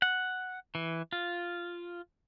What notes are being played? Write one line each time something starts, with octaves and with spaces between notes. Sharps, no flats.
F#5
E3
F4